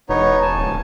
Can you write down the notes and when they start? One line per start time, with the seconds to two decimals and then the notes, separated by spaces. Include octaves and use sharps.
0.09 E1 B3 D#4 C#5
0.42 G#5 A5
0.56 D1